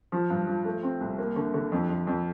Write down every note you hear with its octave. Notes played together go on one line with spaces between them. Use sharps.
F3
G2
F3
A3
C4
C2
A#3
D3
D3
F2
F2
F2